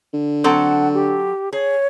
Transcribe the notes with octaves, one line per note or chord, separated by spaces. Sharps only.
D3
F#3 C4 A4 F#5
G4
G#4 C#5